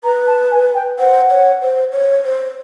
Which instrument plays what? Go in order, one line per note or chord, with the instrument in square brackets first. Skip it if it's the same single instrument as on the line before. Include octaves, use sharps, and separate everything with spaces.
[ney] B4 [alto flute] A#5
[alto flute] A5
G#5
G5
[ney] C5 [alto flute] F#5
[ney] C#5
C5
C#5
C5